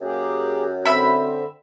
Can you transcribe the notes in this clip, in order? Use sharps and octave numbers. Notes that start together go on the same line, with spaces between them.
F#2 A#3 G4 G#4
D3 C4 E5 B5